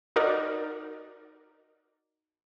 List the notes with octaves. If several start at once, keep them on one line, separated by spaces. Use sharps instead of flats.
D#4 F#4 A#4 D5